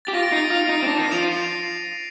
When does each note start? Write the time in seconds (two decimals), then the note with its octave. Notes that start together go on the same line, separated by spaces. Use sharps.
0.05 G4 A6
0.13 F4 A#6
0.23 D7
0.32 D#4 C7
0.50 F4 A#6 D7
0.69 D#4
0.82 C4
0.87 D4 A#6 D7
0.99 D#3 C7 D#7
1.12 F3 D7 F7
1.24 C7 D#7
1.37 C7